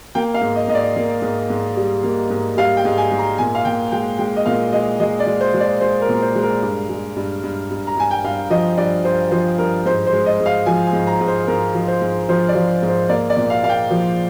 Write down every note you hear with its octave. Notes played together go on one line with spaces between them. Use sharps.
A#3 G5
F5
G#2
D#5
G#2 D#5
D5
A#3
G#2
G#2
G3
A#3
G#2
G3 F5
G5
G#2
G#5
G#2
A#5
A#2 G#5
F5
A#2 G5
G#3 G5
G#3 G5
D#5
A#2 F5
G#3 D#5
G#3 D#5
D5
G#3
C5
G#3
D5
G#3 C5
A#4
A#2
A#4
C5
G#3
A#4
G2
G#3
G2
G2
G2
A#5
G2 G#5
G5
G2 F5
F3 D#5
G2 D5
G2 C5
F3 C5
G2 A#4
G#2 C5
C5
G#3
D#5
G#2
F5
F3 G#5
G#5
G#2
A#5
G#2
C5
G#2 A#4
F3
C5
G#2
F3 C5
D5
F3
G#2
C5
A#3 D5
D5
A#2
F5
A#3 F5
G5
F3